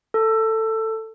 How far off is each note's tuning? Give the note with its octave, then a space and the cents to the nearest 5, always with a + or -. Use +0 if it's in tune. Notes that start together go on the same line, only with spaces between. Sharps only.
A4 +15